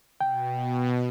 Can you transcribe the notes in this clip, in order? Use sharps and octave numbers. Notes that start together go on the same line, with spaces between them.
B2 G5